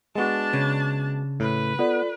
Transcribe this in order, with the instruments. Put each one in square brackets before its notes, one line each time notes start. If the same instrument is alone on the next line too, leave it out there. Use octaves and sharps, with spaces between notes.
[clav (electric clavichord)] G#3 B3 F#4 [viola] D4 A5
[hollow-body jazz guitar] C#3
[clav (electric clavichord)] A2 [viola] B4
[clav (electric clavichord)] B3 [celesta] F4 A4 D5